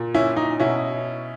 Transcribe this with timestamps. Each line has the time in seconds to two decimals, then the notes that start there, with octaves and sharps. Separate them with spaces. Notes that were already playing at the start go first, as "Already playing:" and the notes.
Already playing: A#2
0.14 C#4 E4
0.36 D#4
0.60 B2 C#4 E4